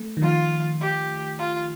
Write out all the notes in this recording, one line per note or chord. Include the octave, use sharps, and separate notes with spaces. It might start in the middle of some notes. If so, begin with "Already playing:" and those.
Already playing: A3
D#3
F3 F4
G4
F4